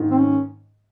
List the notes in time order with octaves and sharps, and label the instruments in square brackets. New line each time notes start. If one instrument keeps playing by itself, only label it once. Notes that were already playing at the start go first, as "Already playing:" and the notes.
Already playing: [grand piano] G#2 D#3 A#3
[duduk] C4
C#4